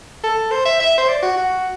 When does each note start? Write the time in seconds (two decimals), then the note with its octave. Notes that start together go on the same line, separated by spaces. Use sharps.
0.24 A4
0.51 C5
0.66 E5
0.80 E5
0.98 C5
1.09 D5
1.23 F#4
1.38 F#4